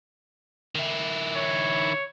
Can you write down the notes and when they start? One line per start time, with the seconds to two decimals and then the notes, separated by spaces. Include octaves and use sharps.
0.75 D#3 E4
1.36 C#5